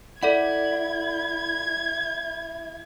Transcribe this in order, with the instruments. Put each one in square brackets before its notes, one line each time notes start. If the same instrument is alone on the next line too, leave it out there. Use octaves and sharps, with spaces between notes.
[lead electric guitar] E4 [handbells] A4 D5 F#5 [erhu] G#6